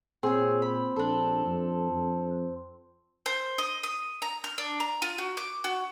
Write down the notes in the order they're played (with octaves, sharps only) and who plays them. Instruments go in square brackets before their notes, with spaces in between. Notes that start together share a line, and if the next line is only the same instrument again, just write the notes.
[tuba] A#2 [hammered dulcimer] C4 [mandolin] G#4 C#5
[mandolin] B5
[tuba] A#1 [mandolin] D4 A4
[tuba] F2
F2
[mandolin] C5
D#5
D#6
A#5
F6
D4
A#5
F4
F#4
D6
F#4